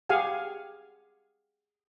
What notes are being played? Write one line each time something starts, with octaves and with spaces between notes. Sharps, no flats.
G4 G#4 F5 F#5 G#5